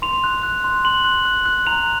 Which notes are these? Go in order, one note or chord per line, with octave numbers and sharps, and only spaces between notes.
C6 F7
F#6
F#6
C6
C6 F#7
F#6
F#6
F#6
A#5 F7